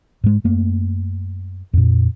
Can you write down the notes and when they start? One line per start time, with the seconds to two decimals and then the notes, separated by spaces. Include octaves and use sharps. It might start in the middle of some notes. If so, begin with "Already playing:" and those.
0.24 G#2 G#3
0.44 F#2 A3 A#3
1.74 F2 A#2